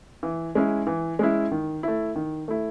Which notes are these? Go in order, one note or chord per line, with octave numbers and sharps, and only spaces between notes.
E3
G#3 C#4 E4
E3
G#3 C#4 E4
D#3
A3 E4
D#3
A3 E4